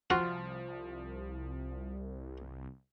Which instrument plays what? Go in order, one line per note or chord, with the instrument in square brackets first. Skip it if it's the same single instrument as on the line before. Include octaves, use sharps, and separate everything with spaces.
[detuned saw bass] C2 [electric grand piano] F3 [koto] F4 [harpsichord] F#4